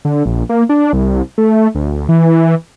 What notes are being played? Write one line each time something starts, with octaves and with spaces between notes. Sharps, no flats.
D3
A#1
A#3
D4
C2
A3
D2
E3